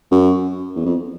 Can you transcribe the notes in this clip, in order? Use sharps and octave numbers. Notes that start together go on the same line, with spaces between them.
F#2
E2
F2